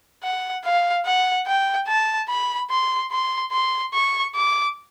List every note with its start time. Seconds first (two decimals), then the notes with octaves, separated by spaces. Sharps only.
0.23 F#5
0.65 F5
1.06 F#5
1.47 G5
1.88 A5
2.29 B5
2.71 C6
3.12 C6
3.52 C6
3.94 C#6
4.35 D6